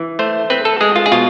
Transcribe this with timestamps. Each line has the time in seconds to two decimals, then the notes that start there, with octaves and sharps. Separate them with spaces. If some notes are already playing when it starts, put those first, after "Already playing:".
Already playing: E3
0.19 A3 C5
0.50 C4 B4
0.65 A4
0.81 G#3 G#4
0.96 F4
1.06 G#4
1.12 B2 F4